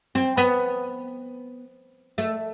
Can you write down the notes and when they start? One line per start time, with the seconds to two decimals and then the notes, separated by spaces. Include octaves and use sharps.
0.15 C4
0.37 B3
2.18 A3